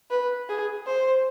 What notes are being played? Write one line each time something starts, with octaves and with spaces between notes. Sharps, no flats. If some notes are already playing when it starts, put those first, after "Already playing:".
B4
G#4
C5